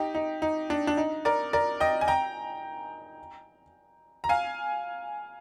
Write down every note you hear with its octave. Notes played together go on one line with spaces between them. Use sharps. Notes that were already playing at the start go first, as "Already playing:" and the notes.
Already playing: D#4 G4
D#4
D#4
D4
D4
D#4
A#4 D5
A#4 D5
D#5 G5
G#5
G5 A#5
A#5
F5 G#5